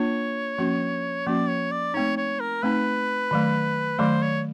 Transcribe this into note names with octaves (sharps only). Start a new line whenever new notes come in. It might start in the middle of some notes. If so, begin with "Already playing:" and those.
Already playing: A#3 D4 F4 C#5
F3 A#3 C#4 F#4
F3 A#3 C#4 F#4 D5
C#5
D5
A3 C4 D#4 C#5
C#5
A#4
A3 C4 D#4 B4
D#3 F#3 A3
D#3 F#3 A3 C5
C#5